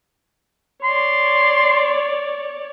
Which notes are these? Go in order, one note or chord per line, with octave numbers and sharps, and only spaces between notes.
C#5 D5 C6